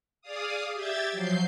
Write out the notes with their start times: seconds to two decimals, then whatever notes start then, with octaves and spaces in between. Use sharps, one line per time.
0.21 G#4 D5 F5 D#6
0.73 G4 E5 G5 G#6 A6
1.12 F3 F#3 G6 C7